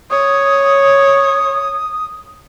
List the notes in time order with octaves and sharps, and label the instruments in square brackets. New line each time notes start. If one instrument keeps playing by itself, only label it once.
[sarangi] C#5 [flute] D#6